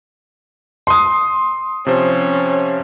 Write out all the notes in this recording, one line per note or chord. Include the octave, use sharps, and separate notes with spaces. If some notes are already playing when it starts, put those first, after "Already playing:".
C6 D#6
C3 F3 C#4 C5